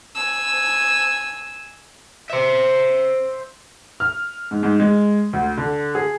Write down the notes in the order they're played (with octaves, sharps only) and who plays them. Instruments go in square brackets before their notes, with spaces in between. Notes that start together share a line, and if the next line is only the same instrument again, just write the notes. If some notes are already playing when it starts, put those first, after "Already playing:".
[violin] G#5 E6
[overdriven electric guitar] C5 E5
[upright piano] F6
G#2
G#2
G#3
D2
D3
G#4